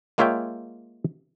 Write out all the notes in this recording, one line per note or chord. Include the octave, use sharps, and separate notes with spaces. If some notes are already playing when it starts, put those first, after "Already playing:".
G#3 A#3 F4 C#5 E5 G5